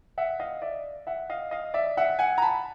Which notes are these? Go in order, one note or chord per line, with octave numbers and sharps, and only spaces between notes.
E5 F#5
D#5 F5
D5 E5
E5 F#5
D#5 F5
D#5 F5
D5 E5
E5 F#5
F#5 G#5
A#5
A5 B5